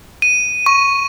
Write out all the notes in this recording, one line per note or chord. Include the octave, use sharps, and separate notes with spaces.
D#7
C#6